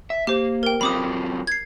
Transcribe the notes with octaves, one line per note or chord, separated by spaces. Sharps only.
E5
A#3 G4 C5
A#4 G5
F#3 C4 F4 B5 D6 D#6
G#6 C7